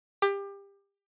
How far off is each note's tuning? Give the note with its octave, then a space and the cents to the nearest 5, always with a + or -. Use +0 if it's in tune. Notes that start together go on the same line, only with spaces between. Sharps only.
G4 +25